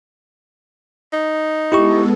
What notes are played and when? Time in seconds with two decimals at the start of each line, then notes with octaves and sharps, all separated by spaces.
1.13 D#4
1.72 G#3 B3 E4 G4 A4 C#6